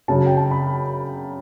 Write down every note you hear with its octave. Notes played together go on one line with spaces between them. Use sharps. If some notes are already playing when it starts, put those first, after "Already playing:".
F#2 C#3 F#3 A5
G5
A5
B5